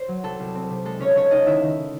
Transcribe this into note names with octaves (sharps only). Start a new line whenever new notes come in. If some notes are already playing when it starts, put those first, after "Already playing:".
Already playing: C5
F#3
C2 A4
C2
C4
C3
G#3 A4
C#2 C#4 C#5
C#2 C#4 C#5
C#2 D#4 D#5
D#3 E4 E5
D#3